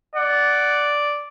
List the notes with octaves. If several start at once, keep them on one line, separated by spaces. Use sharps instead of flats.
D5 F#5